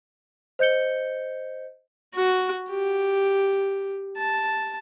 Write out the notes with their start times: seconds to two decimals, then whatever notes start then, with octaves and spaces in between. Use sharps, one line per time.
0.59 C5 D#5 G6 C#7 G7
2.15 F#4
2.70 G4
4.17 A5